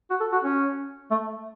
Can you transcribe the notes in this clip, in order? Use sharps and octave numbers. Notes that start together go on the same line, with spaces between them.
F#4
A4
F#4
C#4
A3